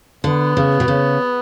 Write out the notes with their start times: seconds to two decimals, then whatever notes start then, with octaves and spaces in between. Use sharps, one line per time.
0.24 D3 B3
0.57 C#3
0.80 B2
0.88 C#3